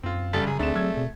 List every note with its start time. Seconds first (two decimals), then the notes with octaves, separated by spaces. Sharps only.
0.03 F#2 C4 F4
0.33 F#1 C#3 G3 A4
0.47 F#2 C#3 G#4
0.59 D2 D3 A3 C4 G#4 D5 E7
0.76 F#3 E6 G#6
0.97 B2